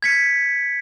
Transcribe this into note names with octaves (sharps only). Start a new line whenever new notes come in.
G#6 B6 C#7